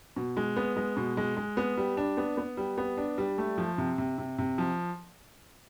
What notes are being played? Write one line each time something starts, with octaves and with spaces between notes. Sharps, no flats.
B2
G#3
B3
G#3
B2
G#3
G#3
B3
G3
D4
B3
B3
G3
B3
D4
G3
A3
F3
C3
C3
C3
C3
F3